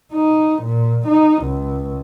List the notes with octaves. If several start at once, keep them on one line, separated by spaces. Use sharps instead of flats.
D#4
A#2
D#4
C#2